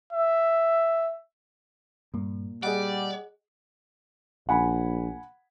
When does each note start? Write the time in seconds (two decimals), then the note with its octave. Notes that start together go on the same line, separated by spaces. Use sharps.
0.13 E5
2.14 G2 A#2 A#3
2.63 G3 G#4 D5 D#5 F#5
4.49 A#1 F#5 G#5 B5